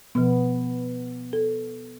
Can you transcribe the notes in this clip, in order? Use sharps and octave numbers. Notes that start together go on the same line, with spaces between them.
B2 F3 B3
A4